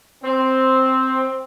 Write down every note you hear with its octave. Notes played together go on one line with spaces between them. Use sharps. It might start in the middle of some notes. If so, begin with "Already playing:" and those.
C4